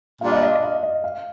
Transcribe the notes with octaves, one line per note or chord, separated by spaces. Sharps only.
A#2 G3 D4 F4 F5
D#5
D#5
F5
D#5
D#5
F5